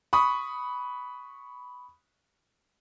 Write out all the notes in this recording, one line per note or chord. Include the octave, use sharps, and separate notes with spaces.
B5 C#6 D#6